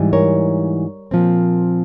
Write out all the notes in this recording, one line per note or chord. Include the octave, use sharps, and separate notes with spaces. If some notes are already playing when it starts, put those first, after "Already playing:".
Already playing: G#2 E3 G3
A#4 C#5
A#2 F3 C4